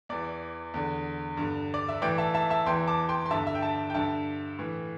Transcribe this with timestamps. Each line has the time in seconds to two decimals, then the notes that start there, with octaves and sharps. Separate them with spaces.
0.09 E2 E3 D5
0.74 E2 D3
1.37 G2 D3
1.74 D5
1.89 E5
2.02 A2 E3 D5 G5
2.18 E5 A5
2.34 E5 A5
2.50 E5 A5
2.66 E2 E3 G5 C6
2.87 A5 D6
3.09 G5 C6
3.26 C6
3.30 G2 D3 E5 A5
3.47 E5
3.55 G5
3.62 E5 A5
3.90 G5
3.94 G2 D3 E5 A5
4.59 A2 E3